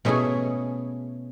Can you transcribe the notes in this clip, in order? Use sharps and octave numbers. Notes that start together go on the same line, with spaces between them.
B2 A3 C#4 E4 G#4